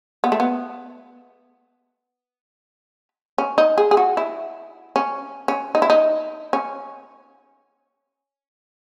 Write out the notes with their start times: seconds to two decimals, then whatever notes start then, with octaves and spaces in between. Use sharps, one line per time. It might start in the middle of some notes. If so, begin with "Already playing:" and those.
0.24 B3
0.32 A3
0.40 B3
3.38 C#4
3.58 D#4
3.78 G#4
3.91 G#4
3.97 F#4
4.17 E4
4.96 C#4
5.48 C#4
5.75 D#4
5.82 E4
5.90 D#4
6.53 C#4